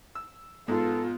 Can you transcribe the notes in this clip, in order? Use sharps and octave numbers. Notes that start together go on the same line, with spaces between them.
E6
G#2 B3 F4 A4